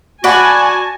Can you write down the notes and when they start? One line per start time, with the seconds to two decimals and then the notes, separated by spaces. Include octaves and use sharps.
0.24 F#4 D5 F#5 G#5 A5 B5